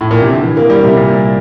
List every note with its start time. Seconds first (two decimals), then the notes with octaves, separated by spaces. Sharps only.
0.01 A2
0.11 A#2
0.22 C3
0.32 D3
0.43 E3
0.57 A#3
0.70 G3
0.84 C3
0.97 A#2